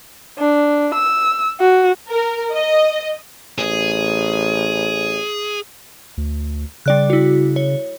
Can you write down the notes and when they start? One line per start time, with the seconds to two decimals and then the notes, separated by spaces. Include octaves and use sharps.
0.39 D4
0.95 E6
1.60 F#4
2.08 A#4
2.52 D#5
3.58 A1 G#4
6.17 D2
6.86 C#3 G3 D5 F#6
7.10 E4 F#4
7.56 C#5